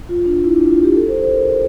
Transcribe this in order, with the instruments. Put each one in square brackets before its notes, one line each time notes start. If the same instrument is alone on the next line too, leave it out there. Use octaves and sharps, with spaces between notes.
[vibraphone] F4
D4
E4
D4
F4
G4
A4
C5
C5
A#4